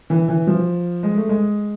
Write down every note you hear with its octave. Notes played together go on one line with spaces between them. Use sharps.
E3
E3
F3
G#3
A3
G#3